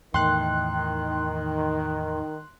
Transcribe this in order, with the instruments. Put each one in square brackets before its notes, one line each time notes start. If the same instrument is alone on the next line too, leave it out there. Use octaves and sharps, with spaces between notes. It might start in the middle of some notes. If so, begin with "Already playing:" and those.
[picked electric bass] E2 A2 [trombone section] D#3 [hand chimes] G5 [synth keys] C6 F#6